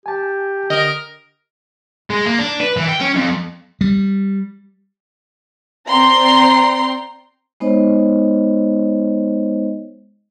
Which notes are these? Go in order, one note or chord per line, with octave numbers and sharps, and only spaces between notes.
G4 G#5 A5
D3 A#4 D#5
G#3
A#3
D4
B4
E3
G5
C#4
F2
G3
C4 D5 G5 A#5 C6 C7
G#3 B3 D#4 C5 C#5 D#5